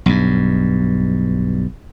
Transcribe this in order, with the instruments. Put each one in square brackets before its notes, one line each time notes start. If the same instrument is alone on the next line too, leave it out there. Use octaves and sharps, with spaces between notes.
[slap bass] B1 G2